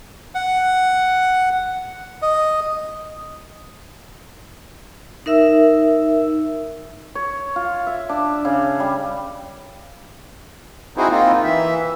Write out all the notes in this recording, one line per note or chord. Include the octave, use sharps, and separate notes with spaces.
F#5
D#5
D#4 A#4 E5 E6
C#5
F4
E5
D4
C#3
G3
C4 D#4 E4 F#4 G#4 C5
A#3 C4 D#4 F4
E3 E5